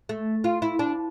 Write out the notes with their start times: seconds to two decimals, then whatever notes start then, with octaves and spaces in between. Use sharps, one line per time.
0.09 A3
0.44 F4
0.62 E4
0.79 D4